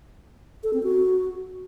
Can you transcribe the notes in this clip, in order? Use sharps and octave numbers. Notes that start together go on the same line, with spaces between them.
A4
C4
F#4